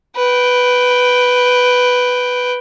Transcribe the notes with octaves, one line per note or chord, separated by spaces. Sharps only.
B4 G5